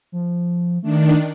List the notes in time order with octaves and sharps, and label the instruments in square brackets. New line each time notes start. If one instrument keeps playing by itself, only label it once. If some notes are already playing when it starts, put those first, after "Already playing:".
[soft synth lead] F3
[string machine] D#3 D4 [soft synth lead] A3